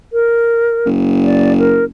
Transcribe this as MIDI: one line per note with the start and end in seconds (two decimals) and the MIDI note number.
0.13 0.89 70
0.86 1.90 30
1.24 1.53 74
1.59 1.84 70